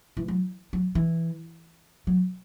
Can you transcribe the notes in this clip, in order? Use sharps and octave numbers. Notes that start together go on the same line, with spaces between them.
E3
F#3
F#3
E3
F#3